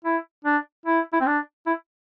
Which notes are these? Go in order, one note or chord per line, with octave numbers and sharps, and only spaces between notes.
E4
D4
E4
E4
C4
D4
E4